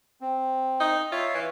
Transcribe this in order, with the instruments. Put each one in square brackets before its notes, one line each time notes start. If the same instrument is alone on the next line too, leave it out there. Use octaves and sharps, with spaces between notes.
[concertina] C4
[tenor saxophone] D#4
[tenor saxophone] F4 [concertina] C#5 E5 F5
[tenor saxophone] E3